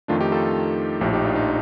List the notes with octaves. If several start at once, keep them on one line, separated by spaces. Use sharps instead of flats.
F2 D#3 A3 D4 F4
D#4 G4
F4 A4
A#1 A2 F3 D#4 G4
D#4 G4
D4 F4
D#4